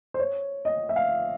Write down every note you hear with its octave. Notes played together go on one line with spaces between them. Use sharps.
C5
C#5
D#5
E5
F5